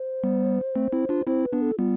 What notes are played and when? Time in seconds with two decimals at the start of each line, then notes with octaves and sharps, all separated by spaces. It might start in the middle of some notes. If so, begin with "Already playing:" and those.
Already playing: C5
0.24 G3 B3
0.75 A3 C4
0.93 C4 E4
1.09 D4 F4
1.27 C4 E4 C5
1.44 B4
1.53 B3 D4
1.62 A4
1.78 G3 B3 F4